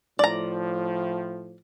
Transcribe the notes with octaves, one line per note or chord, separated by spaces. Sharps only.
A2 F3 D5 A#5